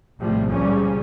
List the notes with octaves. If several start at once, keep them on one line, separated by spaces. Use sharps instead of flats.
A#1 A2 C3 F3 G3
C#2 A#2 C#3 F3 G3 C#4